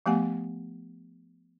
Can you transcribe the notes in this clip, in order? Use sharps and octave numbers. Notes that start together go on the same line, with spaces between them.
F3 A3 B3 G4 F#5 G#5